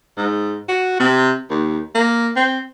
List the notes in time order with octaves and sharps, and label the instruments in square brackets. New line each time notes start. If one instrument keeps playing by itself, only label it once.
[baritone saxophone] G#2
F#4
C3
D#2
A#3
C4